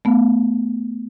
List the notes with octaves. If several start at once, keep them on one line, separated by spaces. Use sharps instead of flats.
A3 B3